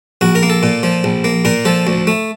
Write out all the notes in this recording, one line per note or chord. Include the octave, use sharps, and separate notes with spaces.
A#1 F#4
A#4
A#3
A4
A#2
F3
A#1
A#3
A#2 A#4
F3 A4
D2
A3